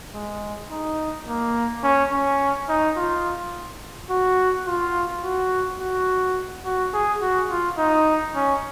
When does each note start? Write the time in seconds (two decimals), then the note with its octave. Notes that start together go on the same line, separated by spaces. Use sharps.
0.14 G#3
0.70 D#4
1.27 A#3
1.84 C#4
2.12 C#4
2.69 D#4
2.97 F4
4.10 F#4
4.67 F4
5.24 F#4
5.80 F#4
6.65 F#4
6.93 G#4
7.22 F#4
7.50 F4
7.78 D#4
8.35 C#4